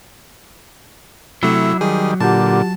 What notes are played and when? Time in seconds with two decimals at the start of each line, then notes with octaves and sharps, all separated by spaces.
1.43 C3 F#3 A3 E4 D6
1.81 D#3 G3 G#4
2.20 A#2 D3 F4 G4 F#5 A5